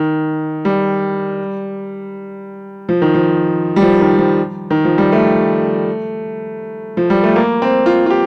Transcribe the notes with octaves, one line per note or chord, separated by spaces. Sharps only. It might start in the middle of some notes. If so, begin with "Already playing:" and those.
Already playing: D#3
G3
F3
D#3
F3
G3
F3
D#3
F3
D#3
F3
G3
A3
F3
G3
A3
A#3
C4
F4
F4
G4